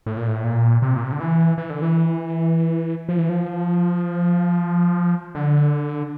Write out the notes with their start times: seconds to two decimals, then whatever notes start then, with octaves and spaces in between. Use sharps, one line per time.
0.06 A2
0.17 A#2
0.28 A2
0.44 A#2
0.82 C3
0.96 A#2
1.04 C3
1.12 D3
1.20 E3
1.58 E3
1.70 D3
1.82 E3
3.09 F3
3.19 E3
3.29 F3
5.35 D3